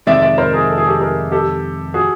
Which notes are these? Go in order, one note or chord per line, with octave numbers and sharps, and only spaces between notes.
F2 C3 D#3 G#3 C4 D5 E5
D5 E5
A#4 C5
G#4 A#4
A4
G#4
G4 A4
G#4 A#4
G4 A4
F#4 G#4